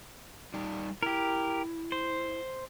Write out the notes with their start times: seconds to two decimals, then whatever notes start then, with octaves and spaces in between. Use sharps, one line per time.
0.54 G3 D#4 D5
1.03 E4 G4 A#4
1.92 C5